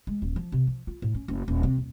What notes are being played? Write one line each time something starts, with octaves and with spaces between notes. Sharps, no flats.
G#3
D#1
F3
C3
F3
F4
A2
C#4
F#1
D#1
C3
D#1